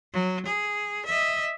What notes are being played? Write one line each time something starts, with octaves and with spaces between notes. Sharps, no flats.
F#3
G#4
D#5 E5